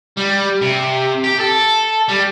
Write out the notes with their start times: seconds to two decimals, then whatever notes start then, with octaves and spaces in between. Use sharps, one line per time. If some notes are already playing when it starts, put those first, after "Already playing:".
0.17 G3
0.62 C3
1.24 G4
1.39 A4
2.09 G3